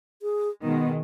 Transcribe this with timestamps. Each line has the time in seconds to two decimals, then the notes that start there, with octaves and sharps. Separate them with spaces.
0.22 G#4
0.63 B2 D#3 G#3 B3